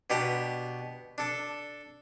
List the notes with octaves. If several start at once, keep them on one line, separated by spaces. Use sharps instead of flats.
B2 D4 G4 A#5
D4 A4